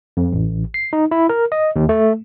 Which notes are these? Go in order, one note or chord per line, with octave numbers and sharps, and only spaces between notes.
F2
A1
C7
D#4
E4
A#4
D#5
D#2
A3